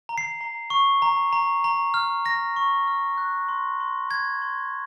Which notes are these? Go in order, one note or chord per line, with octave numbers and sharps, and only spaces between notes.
A#5
C7
A#5
C#6
A#5
A#5
A#5
F6
F6 A#6
C#6
F6
F#6
C6
C6
C6 G#6
C6